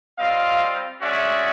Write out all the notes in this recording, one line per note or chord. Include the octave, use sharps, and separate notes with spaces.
G3 C4 F4 D#5 F5
G#3 C#4 F#4 D5 E5